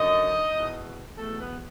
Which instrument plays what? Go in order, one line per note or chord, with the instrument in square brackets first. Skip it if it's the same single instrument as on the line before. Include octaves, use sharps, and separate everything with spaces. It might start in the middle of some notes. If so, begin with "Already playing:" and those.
Already playing: [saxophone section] F#2 D3 D#4 D#5
E2 B2
E2 B2 A3 A4
B3 B4